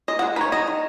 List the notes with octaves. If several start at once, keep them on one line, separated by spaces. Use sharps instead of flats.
G#3 D#5
F#5
G#3
D#4 B4 C#5
D#3 D#5
D#3